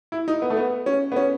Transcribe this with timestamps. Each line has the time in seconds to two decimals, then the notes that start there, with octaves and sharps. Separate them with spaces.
0.12 E4
0.28 D#4
0.42 B3
0.50 A3
0.57 B3
0.86 C#4
1.12 B3
1.16 C#4